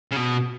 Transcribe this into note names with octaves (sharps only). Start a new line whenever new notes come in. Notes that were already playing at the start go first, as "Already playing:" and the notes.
C#3
B2